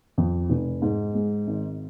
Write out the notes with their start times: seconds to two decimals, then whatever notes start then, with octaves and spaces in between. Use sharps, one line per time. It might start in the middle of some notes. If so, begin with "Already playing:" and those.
0.18 F2
0.50 F1
0.82 G#2
1.15 G#3
1.47 G#1